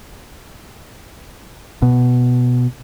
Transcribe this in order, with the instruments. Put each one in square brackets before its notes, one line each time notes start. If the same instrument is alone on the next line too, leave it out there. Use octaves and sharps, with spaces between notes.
[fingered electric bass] B2